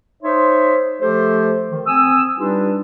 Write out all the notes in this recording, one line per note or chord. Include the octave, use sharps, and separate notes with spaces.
D#4 C5 C#5 E5 C6
F3 A3 G4 A4 C5
D#3
C4 G#5 D#6 E6
G3 D4 D#4 F4 G4 B4